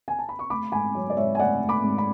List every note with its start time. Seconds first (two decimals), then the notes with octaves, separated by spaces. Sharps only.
0.08 G#5
0.19 A5
0.29 B5
0.39 C#6
0.50 A3 B5 D6
0.72 G#2 G#5 B5
0.94 F#3 C#5
1.10 D5
1.17 G#2 C#5 E5
1.35 G#5
1.39 A3 D5 F#5
1.62 A3
1.69 B5 D6
1.83 G#2
1.98 B5